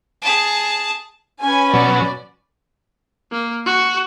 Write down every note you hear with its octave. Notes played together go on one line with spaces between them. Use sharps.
G#4 A5
C#4 B4 G#5
B2 F#3 D5
A#3
F#4